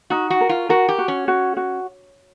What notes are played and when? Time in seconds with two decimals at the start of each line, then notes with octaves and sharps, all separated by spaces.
0.10 D#4 F#4
0.30 F#4
0.41 A#4
0.49 F4
0.69 F#4 A#4
0.89 G4
0.98 F#4
1.08 C#4
1.28 F#4
1.57 F#4